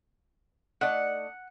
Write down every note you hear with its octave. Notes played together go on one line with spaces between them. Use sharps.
A3 D#4 D5 F#5